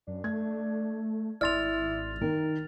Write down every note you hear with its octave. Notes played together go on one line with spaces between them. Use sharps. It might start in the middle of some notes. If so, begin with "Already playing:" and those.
F#2 D4
A3 G#6
G#1 E4 D5 C6 F6 A6 F7
D#3 A#4